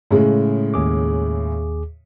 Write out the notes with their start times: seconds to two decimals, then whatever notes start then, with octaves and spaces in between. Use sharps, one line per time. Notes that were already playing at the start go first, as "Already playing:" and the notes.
0.11 A2 C#3 G#3
0.74 D#2 G#4 D6